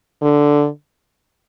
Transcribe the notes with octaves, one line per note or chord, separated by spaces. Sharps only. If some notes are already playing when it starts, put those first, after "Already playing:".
D3